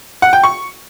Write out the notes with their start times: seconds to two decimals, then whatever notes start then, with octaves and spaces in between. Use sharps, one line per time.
0.22 F#5
0.33 G5
0.43 C#6